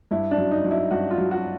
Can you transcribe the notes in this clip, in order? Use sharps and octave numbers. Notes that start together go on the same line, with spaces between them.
G2 E4
D4
F#3
D#4
F#3
E4
G2 F#4
F4
F#3
F#4